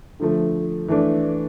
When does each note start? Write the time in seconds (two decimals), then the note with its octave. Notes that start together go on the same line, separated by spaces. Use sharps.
0.20 D3 F3 A3
0.88 E3 A3 D4